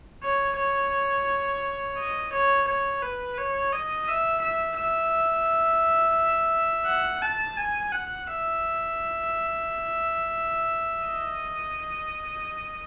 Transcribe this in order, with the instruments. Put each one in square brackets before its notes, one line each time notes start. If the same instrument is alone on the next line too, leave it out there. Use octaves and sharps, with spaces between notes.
[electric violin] C#5
C#5
D#5
C#5
C#5
B4
C#5
D#5
E5
E5
E5
F#5
A5
G#5
F#5
E5
D#5